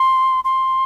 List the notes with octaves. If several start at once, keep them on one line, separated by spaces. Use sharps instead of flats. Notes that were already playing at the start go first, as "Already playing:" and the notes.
Already playing: C6
C6